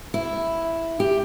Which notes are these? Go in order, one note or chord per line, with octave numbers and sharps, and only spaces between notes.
E4
G4